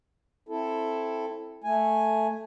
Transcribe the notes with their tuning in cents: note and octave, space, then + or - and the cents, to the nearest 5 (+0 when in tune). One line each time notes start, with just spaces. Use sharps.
C4 +10 E4 +5 A4 +0
A3 +0 A4 +0 G#5 +0